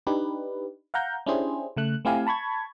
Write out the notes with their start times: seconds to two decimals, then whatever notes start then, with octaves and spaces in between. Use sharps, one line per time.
0.07 D4 D#4 G4 B4
0.94 F5 F#5 A#5 G6
1.26 C#4 D4 E4 G4 G#4 C5
1.77 C#3 A3 F#6
2.05 A3 C4 E4 G4 F5 G#5
2.27 A5 B5 C#6 G#6